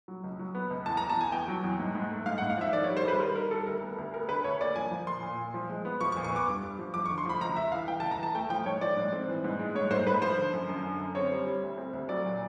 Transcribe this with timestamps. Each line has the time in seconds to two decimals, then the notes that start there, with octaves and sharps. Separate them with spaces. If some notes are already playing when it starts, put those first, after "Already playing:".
0.08 F#3
0.24 C#2
0.39 F#3
0.55 B3
0.71 C#2
0.86 E2 A5
0.97 A#5
1.01 E2
1.10 A5
1.17 E2 G#5
1.32 E2 G5
1.48 F#3
1.64 E2
1.80 G#2
1.95 G#2
2.11 A3
2.26 G#2 F5
2.38 F#5
2.42 G#2
2.50 F5
2.57 F3 E5
2.73 D#3 D5
2.84 C#5
2.88 G3
2.97 C5
3.05 G3 B4
3.20 G3 A#4
3.36 D#3 A#4
3.51 G3 A4
3.67 D2 A#4
3.82 B3
3.98 D2
4.13 B3 A#4
4.29 D3 B4
4.44 D2 C#5
4.61 A#3 D5
4.76 F3 G#5
4.91 F3
5.07 A#2 C6
5.23 A#2
5.38 A#2
5.54 F3
5.70 G#3
5.85 B3
6.01 F3 C#6
6.12 C#6
6.16 A#2
6.24 C#6
6.32 B3 D6
6.47 G2
6.63 G2
6.79 F3
6.94 F3 D6
7.06 C#6
7.10 D3
7.18 C6
7.25 F3 B5
7.41 C#2 A#5
7.56 C#2 E5
7.72 E3 F5
7.88 E3 G5
8.00 A5
8.04 C#2
8.11 A#5
8.19 E3 A5
8.35 A3 G5
8.50 F3 G5
8.66 G#2 C#5
8.81 F3 D5
8.97 G#2
9.13 C4
9.28 E3
9.44 G#2
9.59 G#3
9.75 G#2 C#5
9.91 G#2 C5
10.07 G#2 B4
10.22 F3 C5
10.37 D3
10.53 F#2
10.69 F#2
10.84 D3
11.00 F#2
11.15 C4 C#5
11.32 G3
11.47 G3
11.63 D2
11.78 C4
11.93 D2
12.09 F#3 D5
12.25 A#2